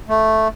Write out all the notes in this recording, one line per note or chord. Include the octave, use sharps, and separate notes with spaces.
A3